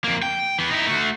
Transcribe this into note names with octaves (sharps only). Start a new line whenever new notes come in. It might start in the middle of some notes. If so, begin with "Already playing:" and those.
F2 A#3
G5
E3 B3
D#4 E4
A3 F#4